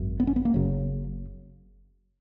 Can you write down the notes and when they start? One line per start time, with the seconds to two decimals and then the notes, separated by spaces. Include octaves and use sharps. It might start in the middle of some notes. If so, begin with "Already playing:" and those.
Already playing: G#1 F#2
0.20 B3
0.27 C#4
0.36 B3
0.45 A#3
0.54 F#1 F#2 C#3 F#3